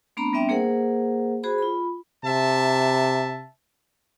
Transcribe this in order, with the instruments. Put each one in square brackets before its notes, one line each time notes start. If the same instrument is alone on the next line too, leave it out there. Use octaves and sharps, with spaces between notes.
[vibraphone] A3 B3 C4 D4 A#5 B5
G3 B3 C4 D4 E5 G5
A#3 G#4 A#4 C5 F#5
F#4 G#4 C5 B5
F4 B5
[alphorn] C3 [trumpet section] E5 A5